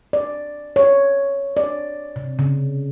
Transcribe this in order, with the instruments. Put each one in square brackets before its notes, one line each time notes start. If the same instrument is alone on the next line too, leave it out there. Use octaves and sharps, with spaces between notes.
[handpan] D5
C#5
D5
C3
C#3